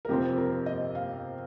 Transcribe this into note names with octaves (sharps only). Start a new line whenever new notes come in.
A#4
F2 C3 F3 C4 G4
A#4
D#5
F5